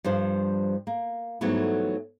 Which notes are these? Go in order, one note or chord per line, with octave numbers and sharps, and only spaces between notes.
G2 F3 G3 C5
A#3
G#2 E3 F#3 G3 A3 B3